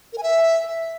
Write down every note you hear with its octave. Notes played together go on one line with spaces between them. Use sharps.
A#4
G#5
E5